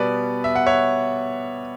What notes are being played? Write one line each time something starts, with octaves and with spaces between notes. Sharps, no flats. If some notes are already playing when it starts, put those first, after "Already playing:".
Already playing: B2 G3 B3 B4 D5
E5
F#5
C#5 E5